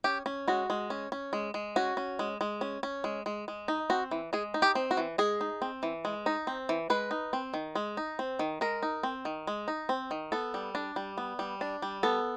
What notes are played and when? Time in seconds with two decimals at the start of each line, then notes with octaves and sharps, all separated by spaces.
0.04 C#4 G4
0.26 C#4
0.48 G#3 F#4
0.70 G#3
0.90 C#4
1.12 C#4
1.33 G#3
1.54 G#3
1.76 C#4 F#4
1.97 C#4
2.19 G#3
2.41 G#3
2.61 C#4
2.83 C#4
3.04 G#3
3.26 G#3
3.48 G#3
3.68 D#4
3.90 C4 F#4
4.11 E3
4.33 G#3 G#4
4.54 D#4
4.62 G4
4.75 C4
4.91 F#4
4.97 E3
5.18 G#3 G#4
5.41 D#4
5.62 C4
5.83 E3
6.05 G#3
6.26 D#4
6.47 C4
6.69 E3
6.90 G#3 B4
7.11 D#4
7.33 C4
7.54 D#3
7.75 G#3
7.97 D#4
8.19 C4
8.39 D#3
8.61 G#3 A#4
8.83 D#4
9.03 C4
9.25 D#3
9.47 G#3
9.68 D#4
9.89 C4
10.11 D#3
10.32 B3 A4
10.54 G3
10.75 D4
10.96 G3
11.17 B3
11.39 G3
11.61 D4
11.82 G3
12.03 B3 A4